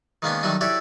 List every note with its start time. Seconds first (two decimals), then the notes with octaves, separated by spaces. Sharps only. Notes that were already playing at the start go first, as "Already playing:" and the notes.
0.22 D#3 G#3 A#3 B3 C#4 D4
0.43 D#3 F#3 G3 A3 D4 D#4
0.61 E4 F#4 G4 A4 C#5 D5